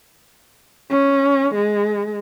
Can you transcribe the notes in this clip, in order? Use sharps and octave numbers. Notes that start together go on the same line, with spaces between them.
C#4
G#3